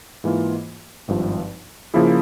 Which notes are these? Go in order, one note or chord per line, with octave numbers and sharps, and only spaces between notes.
G#2 E3 A#3 F4
G#1 G2 F3
C#3 F3 A#3 E4 G#4